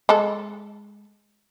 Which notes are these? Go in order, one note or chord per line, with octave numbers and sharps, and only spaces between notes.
G#3 A4